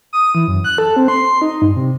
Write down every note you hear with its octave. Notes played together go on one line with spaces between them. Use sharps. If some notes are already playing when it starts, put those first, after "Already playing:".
D#6
E3
F#2
F#6
A4
C4
C6
D#4
G2
C3